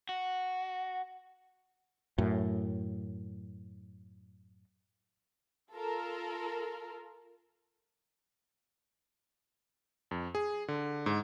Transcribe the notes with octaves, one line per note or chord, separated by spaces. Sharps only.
F#4
F#2 A2
F4 A4 A#4
F2
G#4
D3
G#2